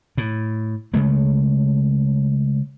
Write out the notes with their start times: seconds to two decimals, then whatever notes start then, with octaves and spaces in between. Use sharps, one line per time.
0.17 A2
0.94 C#3 G#3 A3